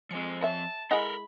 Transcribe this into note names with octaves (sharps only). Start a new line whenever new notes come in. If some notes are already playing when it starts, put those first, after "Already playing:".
F3 G#3 C4 C#7
C#5 E5 A5
G#3 E4 A4 A#4 D#5 F#5 A#5 B5